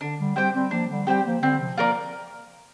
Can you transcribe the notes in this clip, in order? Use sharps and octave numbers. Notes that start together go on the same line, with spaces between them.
D3 D4
D3 G3
G3 C4 G4 C5 G5
G3 C4
F3 A#3 D4
D3 G3
G3 C4 G4 C5 G5
F3 A#3
D3 G3 C4
C3 F3
F3 A#3 F4 A#4 D5